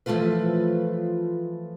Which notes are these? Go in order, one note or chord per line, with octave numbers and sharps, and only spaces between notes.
E3 F3 G#3 A3 F4 B4